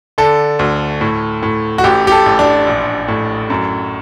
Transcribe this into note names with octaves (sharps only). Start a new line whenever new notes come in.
D3 A4
D2
A2
A2
F#4
A1 G4
G4
A4
A1
D4
A#1
A2
F#2